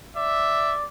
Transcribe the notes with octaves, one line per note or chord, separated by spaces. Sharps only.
D5 E5